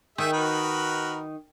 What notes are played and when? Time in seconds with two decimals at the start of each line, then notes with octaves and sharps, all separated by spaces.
0.18 D#3 G#4 E5
0.33 F#4 A#4 B4